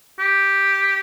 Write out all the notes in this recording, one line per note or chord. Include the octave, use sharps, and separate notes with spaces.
G4